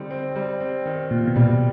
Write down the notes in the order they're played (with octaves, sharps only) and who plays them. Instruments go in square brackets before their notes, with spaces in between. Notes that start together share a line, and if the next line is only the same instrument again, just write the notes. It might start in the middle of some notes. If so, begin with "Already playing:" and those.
Already playing: [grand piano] D3 G3 C4 D#4
C4
G3
C4
D#3
[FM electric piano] A#2 [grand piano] F4
[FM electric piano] B2
[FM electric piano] A#2 [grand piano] G3